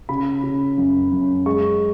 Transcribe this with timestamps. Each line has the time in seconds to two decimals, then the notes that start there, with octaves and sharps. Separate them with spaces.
0.09 C#3 B5
0.43 C#3
0.78 F#2
1.12 F#2
1.46 G#3 C#6